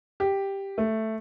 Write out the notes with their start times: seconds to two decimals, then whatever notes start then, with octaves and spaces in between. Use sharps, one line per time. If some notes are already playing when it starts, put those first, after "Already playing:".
0.20 G4
0.78 A3